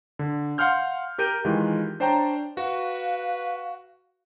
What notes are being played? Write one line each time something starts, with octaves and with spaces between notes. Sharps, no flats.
D3
F5 F#5 C6 F6 G6
G4 A#4 G6 D7 D#7
D#3 E3 G#3 F4 G4
D4 C5 C#5 G5 A5 A#5
F#4 B4 F5